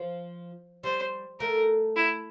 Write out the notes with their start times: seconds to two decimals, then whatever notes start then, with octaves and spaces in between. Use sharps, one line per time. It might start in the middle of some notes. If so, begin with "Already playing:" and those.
Already playing: F3
0.83 G3 C5
1.40 A3 A#4
1.96 E4